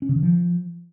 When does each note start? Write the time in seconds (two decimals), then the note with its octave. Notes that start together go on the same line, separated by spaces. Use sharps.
0.02 C#4
0.09 C#3
0.16 D#3
0.23 F3